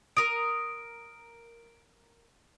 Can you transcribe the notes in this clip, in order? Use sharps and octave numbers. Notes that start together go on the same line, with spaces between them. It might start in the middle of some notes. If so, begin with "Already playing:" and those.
A#4 D#6 D7